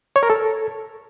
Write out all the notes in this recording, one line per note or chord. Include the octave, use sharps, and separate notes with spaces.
C#5
A#4
A4